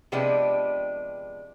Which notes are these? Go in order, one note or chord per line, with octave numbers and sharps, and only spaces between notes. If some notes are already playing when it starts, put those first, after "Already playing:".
C3 F3 G#3 B3 D4 G4